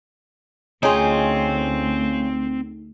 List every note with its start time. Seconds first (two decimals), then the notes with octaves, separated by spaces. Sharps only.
0.83 D2 C4 C#4 D#4 F4 G#4 G5